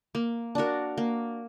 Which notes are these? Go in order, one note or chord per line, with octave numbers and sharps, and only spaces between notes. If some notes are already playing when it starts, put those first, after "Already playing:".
A#3
D4 F#4 A#4
A#3